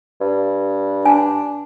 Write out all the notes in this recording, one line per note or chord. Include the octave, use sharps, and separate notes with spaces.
G2
D4 G#5